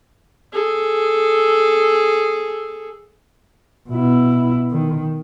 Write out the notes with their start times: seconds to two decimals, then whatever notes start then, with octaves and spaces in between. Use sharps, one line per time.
0.53 G#4 A4
3.89 B2 E4
4.71 D#3